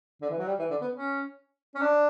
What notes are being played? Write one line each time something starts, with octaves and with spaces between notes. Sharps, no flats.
D3
E3
F#3
G3
E3
D3
B3
C#4
C#4
D4